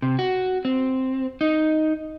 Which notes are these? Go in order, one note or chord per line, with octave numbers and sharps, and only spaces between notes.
C3
F#4
C4
D#4